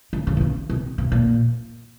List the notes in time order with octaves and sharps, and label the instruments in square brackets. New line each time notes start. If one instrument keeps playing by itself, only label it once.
[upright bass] C#3
C#3
C3
C#3
C3
C3
A#2